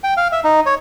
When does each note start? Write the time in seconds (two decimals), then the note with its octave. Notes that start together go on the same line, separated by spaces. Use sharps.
0.04 G5
0.17 F5
0.32 E5
0.44 D#4
0.66 C#5